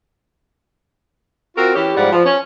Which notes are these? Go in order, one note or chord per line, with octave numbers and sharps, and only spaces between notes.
C4 F4 F#4 A#4
E3 C#4 G4
G#2 F3 G3 D5 F#5
F3
C#4